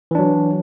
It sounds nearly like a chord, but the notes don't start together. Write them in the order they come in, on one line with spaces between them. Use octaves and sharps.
E3 D4 F#3